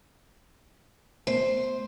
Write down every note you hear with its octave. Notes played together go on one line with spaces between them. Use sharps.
A3 B3 C5